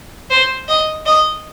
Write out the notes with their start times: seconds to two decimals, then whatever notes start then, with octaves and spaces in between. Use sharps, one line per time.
0.30 C5
0.68 D#5
1.06 D#5